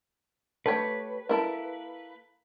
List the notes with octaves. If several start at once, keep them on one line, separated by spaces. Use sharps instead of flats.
A3 G4 B4 C#5
A#3 E4 A4